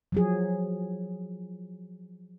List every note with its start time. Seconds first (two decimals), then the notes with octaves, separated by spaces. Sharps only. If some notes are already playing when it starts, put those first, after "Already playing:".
0.12 F3 F#3 G#4